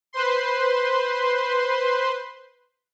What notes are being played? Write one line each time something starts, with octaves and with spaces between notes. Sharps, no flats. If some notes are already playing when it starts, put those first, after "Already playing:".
B4 C5 C6